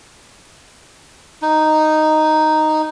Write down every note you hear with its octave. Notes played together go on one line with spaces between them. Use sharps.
D#4